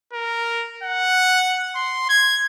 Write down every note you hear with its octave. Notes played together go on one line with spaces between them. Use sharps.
A#4
F#5
C6
G#6